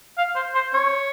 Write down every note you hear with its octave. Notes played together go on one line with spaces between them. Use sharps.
F5
C5
C5
C#5